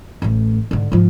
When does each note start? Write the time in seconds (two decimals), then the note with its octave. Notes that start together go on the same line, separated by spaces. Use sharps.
0.22 A1 A3
0.71 G#2 D3
0.92 G#2 F3